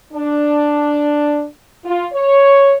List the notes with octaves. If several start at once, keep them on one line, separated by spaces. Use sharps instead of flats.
D4
F4
C#5